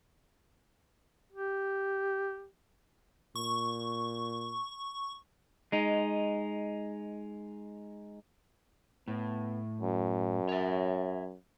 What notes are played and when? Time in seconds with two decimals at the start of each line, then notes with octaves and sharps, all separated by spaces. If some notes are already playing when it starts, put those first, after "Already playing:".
1.33 G4
3.35 A#2 C#6
5.72 G#3 D#4
9.08 A2 B3
9.81 F#2
10.49 C#5 E5